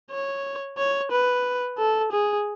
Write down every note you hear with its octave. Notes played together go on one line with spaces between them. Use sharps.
C#5
C#5
B4
A4
G#4